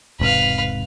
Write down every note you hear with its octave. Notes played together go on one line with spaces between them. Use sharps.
E1 G#2 C3 B4 F5